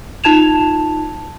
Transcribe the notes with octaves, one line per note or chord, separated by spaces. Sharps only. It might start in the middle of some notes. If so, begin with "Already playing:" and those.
D#4 F4 A5 G#6 E7 F7